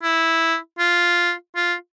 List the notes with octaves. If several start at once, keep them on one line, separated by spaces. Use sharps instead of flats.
E4
F4
F4